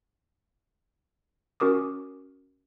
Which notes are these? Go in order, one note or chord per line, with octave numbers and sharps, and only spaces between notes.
C#4 F#4 A#4 D6 D#6